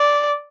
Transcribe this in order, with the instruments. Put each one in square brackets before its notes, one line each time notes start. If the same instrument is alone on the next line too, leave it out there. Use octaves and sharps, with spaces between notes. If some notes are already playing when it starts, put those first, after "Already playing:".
Already playing: [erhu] D5